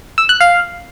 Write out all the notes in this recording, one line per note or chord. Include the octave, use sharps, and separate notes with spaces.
E6
F#6
F5